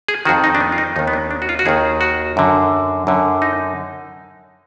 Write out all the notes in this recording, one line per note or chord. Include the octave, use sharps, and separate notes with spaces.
G#4
F2 D#3 F#4
D#4
D4
B3
F4
D#4
D#2 D#3 D#4
B3
D4
D4
F#4
F4
F#4
D#2 D#3 G#4
F#4
F#2 D3
F#2 D3
D#4